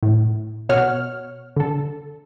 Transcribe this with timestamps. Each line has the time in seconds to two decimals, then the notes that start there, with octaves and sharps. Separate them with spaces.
0.03 A2
0.69 B2 C#5 F#5 F6
1.56 D3 A4